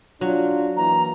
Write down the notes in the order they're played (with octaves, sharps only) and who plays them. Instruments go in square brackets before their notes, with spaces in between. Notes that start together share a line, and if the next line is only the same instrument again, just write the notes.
[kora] F#3 [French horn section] D4 F4
[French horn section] E3 A#3 [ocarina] A#5